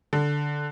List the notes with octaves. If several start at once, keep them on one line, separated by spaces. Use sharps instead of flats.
D3